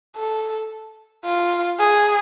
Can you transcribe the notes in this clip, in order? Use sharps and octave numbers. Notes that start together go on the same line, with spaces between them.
A4
F4
G#4